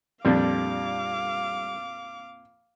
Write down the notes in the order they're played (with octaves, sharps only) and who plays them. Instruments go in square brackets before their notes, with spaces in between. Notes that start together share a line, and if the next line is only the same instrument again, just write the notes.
[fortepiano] F2 A#2 [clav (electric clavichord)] G3 D4 [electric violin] F5 D6